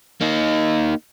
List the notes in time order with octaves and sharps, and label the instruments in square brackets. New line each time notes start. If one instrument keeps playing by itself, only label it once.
[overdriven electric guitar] A#3 D#4